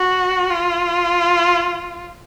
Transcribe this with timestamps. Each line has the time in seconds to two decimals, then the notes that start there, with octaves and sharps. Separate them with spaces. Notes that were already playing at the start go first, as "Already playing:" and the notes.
Already playing: F#4
0.50 F4